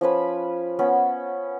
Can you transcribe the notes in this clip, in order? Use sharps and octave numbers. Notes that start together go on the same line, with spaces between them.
F3 C#4 B4 B5
B3 C#4 B5